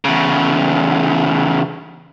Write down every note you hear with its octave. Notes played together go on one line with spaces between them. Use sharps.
E2 C#3